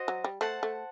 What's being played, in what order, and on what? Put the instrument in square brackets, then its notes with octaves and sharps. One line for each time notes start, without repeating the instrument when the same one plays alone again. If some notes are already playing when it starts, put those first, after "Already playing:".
Already playing: [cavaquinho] F#4 C5 D#5
[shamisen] F#3
G3
[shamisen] A3 [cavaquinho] C5 F#5 A5
[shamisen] A3